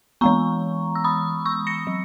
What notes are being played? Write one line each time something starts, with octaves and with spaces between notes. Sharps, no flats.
E3 G#3 B3 A#5 C#6
E6
B5 D#6
C#6 E6
A#6 C#7
F#3